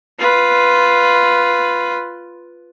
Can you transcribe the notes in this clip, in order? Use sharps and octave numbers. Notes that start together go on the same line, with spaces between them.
F4 B4